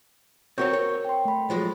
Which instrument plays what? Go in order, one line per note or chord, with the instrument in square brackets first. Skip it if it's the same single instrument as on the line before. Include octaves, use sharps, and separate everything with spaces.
[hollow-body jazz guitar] C4 F#4 C#5 [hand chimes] A#4 C#6 G6
[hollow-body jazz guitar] C#5
[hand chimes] G5 C6
A3 B5
[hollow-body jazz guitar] F3 F#3 G#3